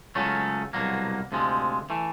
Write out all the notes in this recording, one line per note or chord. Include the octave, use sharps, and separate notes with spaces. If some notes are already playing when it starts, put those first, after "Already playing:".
C#2 C#3 F#3 A3 C#4
C2 B2 F#3 A#3
D2 C3 F3 G#3
E3 A3